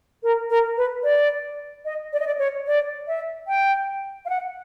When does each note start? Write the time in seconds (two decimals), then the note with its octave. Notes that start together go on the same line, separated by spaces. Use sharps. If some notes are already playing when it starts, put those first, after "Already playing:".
0.23 A#4
0.50 A#4
0.77 B4
1.04 D5
1.85 D#5
2.13 D5
2.20 D#5
2.27 D5
2.39 C#5
2.67 D5
3.07 E5
3.47 G5
4.25 F5
4.29 F#5